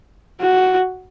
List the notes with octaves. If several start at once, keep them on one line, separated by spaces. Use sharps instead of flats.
F#4